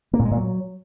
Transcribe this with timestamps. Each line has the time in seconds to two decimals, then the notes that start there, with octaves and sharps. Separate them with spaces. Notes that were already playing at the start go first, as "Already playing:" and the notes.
0.13 A#3
0.19 A#2
0.25 G#3
0.31 A#2
0.37 F#3